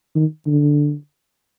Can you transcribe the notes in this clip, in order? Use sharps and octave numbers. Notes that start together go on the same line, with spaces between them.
D#3
D3